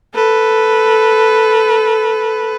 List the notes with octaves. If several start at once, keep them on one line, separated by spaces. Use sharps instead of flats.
A4 B4